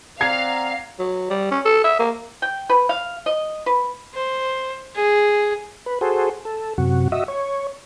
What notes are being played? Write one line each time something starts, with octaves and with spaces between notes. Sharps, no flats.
C4 D5 F5 F#5 A#5 G#6 C7
F#3
G3
C#4
A4
E5
A#3
G5
B4
F5
D#5
B4
C5
G#4
B4
F#4 G#4 A4 C5
A4
F#2 C3 F#4
F#4 D#5 E5
C#5